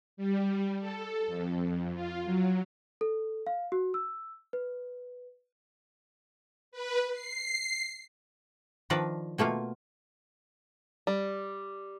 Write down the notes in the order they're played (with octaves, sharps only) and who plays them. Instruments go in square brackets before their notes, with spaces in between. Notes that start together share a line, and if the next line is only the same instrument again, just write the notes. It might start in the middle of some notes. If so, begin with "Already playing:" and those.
[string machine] G3
A4
F2
F4
F#3
[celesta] A4
F5
F#4
E6
B4
[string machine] B4
C7
[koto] D#3 F3 D4 A#4 B4 D5
B2 A3 A#3 F4
[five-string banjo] G3